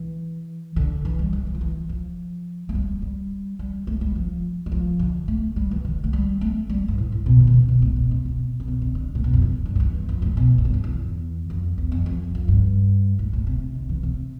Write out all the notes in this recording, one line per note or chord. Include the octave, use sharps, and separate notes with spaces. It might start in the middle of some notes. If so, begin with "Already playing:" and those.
Already playing: E3
D3
E3
G3
E3
D3
F3
E3
F3
A3
G3
G3
G3
A3
G3
F3
G3
F3
D3
A3
G3
E3
D3
A3
G3
A3
G3
G2
A2
A2
B2
D3
B2
C3
B2
A2
B2
C3
B2
C3
B2
C3
D3
A2
B2
F2
A2
A2
G2
F2
E2
G2
F2
A2
B2
A2
G2
F2
E2
F2
E2
F2
F2
F2
G2
A2
A2
C3
D3
E3
C3